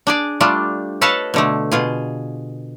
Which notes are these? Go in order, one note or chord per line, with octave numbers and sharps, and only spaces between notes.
D4 G#4 D5
G3 A3 D4 F4
A4 B4 C#5 D#5 F5 A5
B2 D3 A3
B2 F4 G#4